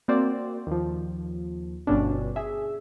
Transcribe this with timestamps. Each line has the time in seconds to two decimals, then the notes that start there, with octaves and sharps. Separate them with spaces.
0.08 A#3 C4 F#4 C5 D5
0.67 D#2 F3
1.87 G1 G2 B2 C#4 D4
2.36 G#4 E5